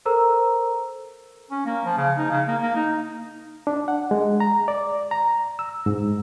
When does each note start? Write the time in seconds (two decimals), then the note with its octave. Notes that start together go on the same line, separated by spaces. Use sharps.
0.05 A4 A#4 C5 A#5 E6
1.51 C#4
1.66 A#3
1.85 F3
1.97 C#3
2.17 D#4
2.30 C#3
2.47 A#3
2.62 A#3
2.75 D#4
3.67 D4
3.88 F#5
4.11 G#3
4.40 A#5
4.68 D5
5.11 A#5
5.59 E6
5.86 G#2